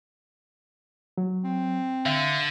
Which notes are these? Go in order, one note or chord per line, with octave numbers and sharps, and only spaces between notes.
F#3
C4
D3 E5 F5 G6